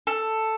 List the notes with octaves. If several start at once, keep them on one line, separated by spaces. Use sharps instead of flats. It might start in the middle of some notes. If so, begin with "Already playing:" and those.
A4